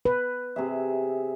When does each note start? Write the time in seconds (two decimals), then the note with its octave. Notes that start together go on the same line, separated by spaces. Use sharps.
0.05 B4
0.56 C3 G#4 E5